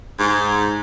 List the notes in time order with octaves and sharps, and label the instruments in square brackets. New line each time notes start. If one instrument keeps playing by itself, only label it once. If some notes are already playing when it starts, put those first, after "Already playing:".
[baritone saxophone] G#2